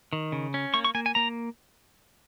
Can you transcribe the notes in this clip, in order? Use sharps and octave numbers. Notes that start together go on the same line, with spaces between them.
D#3
C#3
C#4
A#3 C#6
C#6
A#3 G#5
G#5
A#3 A#5